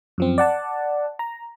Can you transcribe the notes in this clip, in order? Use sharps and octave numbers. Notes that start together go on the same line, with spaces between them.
F#2 F3 C4
D5 F#5 A5
A#5